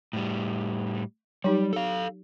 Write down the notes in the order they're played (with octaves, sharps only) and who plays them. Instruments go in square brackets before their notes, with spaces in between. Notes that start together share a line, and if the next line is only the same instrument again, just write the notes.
[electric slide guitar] A2 G3
[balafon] F#3 D#4 G4 [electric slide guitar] G3
[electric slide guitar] A4 F5